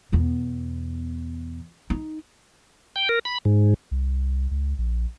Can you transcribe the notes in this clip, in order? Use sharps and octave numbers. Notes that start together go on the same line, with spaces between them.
E2 B2
D#4
G5
A#4
B5
G#2
C2
C#2
A#1